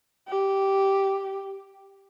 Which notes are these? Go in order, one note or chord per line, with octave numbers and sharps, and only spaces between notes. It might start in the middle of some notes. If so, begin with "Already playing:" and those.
G4